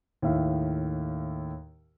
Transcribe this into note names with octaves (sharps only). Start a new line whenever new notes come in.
D#2 A2 E5 F5